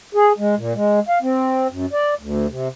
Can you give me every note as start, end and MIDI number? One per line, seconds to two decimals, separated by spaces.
0.15 0.32 68
0.38 0.55 56
0.57 0.73 46
0.75 1.00 56
1.09 1.18 77
1.22 1.67 60
1.71 1.86 42
1.93 2.14 74
2.19 2.47 38
2.50 2.68 48